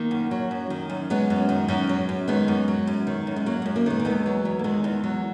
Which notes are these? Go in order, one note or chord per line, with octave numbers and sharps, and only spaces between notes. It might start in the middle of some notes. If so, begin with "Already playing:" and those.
Already playing: D#3 A#3
F#2
F#3
F#2
D#3
F#2
F#3 G#3 B3
F#2
D#3
F#2
F#3
F#2
D#3 G#3 B3
F#2
F#3
F#2
D#3
F#2
G#3
F#3 A#3
F#2 G#3
A#3
D#3 G#3 B3
A#3
E2 G#3 B3
F#3
E2
A#3
D#3 G#3
E2
F#3